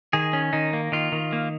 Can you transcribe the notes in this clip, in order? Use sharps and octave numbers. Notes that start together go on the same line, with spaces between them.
D#3 G#4
C#4
D#3 D#4
A#3
D#3 F4
D#3
A#3